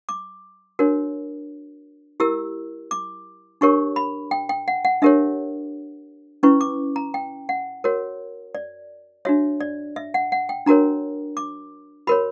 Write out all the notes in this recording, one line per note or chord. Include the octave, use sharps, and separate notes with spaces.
D6
D4 F#4 A#4 C#5
E4 G4 A#4 E6
D6
D4 G4 A#4 C#5 C#6
B5
G5
G5
F#5
F#5
D4 G4 A#4 C#5 E5
C#4 E4 B4 C#6
D6
A#5
G5
F#5
F#4 A#4 C#5
D5
D4 F#4 C#5 E5
D5
E5
F#5
F#5
G5
D4 F#4 A#4 C#5 A#5
D6
F#4 A#4 C#5 B5